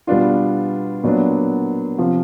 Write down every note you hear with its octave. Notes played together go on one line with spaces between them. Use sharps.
B2 G3 B3 D4 F4
A#2 F#3 B3 D4
C3 F3